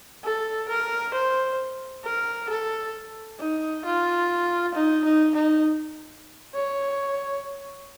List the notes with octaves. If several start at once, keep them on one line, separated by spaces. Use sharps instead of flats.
A4
A#4
C5
A#4
A4
D#4
F4
D#4
D#4
D#4
C#5